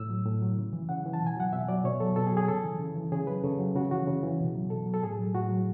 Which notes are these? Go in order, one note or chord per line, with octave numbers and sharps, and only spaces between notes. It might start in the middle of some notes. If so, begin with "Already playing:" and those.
Already playing: A2 E6
F#3
A2
F#3
C#3
E3
C#3 F#5
E3
A5
B2
G#5
F#3 F#5
B2 E5
F#3 D5
B2 C#5
F#3 A4
B2 A4
G#4
F#3
G#4
C#3 A4
E3
C#3
E3
C#3 G#4
F#3 B4
C#3 A4
F#3
C#3 F#4
E3 F#4
C#3
E3
B2
F#3
B2 A4
F#3
A4
A2 G#4
F#3
A2 F#4
F#3